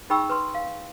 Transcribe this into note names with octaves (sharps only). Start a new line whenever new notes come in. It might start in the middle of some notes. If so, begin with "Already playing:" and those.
D#4 G#4 G5 B5 C#6 E6
B4 C6
F5